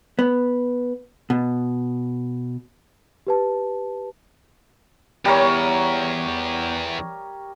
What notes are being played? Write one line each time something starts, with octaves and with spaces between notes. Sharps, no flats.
B3
B2
G4 B4 A5
E2 G3 A#4 C#5